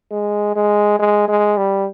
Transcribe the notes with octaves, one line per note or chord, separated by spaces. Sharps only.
G#3
G#3
G#3
G#3
G3